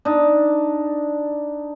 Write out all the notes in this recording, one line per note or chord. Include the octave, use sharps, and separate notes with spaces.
D4 D#4